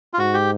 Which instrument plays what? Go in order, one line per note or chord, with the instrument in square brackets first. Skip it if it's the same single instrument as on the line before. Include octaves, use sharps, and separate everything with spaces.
[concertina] F4
[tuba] G#2 [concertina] F#4
[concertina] G4